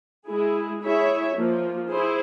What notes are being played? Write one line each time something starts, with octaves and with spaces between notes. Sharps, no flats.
G#3 E4 G#4
E4 G#4 C#5 E5
F3 A#3 F4
E4 G#4 C5